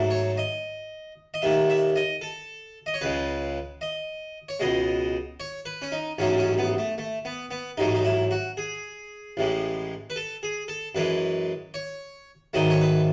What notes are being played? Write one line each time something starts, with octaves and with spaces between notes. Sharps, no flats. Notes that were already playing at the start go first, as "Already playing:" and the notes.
Already playing: G#2 F#3 A3
C#5
D#5
D#5
D#2 D#3 A3 E5
E5
D#5
A4
D#5
C#5
C#2 C#3 G#3 B4
D#5
C#5
C#2 B2 G#3 D#5
C#5
B4
C#4
D#4
A1 G#2 F#3 A3 C#4
C#4
B3
A3
A3
B3
B3
A1 G#2 F#3 A3 D#4
D#4
E4
F#4
G#4
A1 A2 E3 G#3
B4
A4
G#4
A4
F#2 E3 G#3 B4
C#5
G#2 D#3 F#3 A3 D#5
C#5
B4